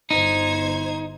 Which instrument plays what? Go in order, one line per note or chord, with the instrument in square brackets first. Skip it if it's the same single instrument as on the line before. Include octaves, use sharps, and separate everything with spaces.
[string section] G1 C5 G#6 [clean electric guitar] D#4